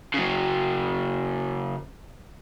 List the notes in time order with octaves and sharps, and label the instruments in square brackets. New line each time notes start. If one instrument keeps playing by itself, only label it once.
[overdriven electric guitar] C#3 F#3